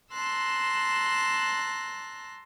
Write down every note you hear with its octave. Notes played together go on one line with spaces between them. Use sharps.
A5 A#5 C6 E6 F#6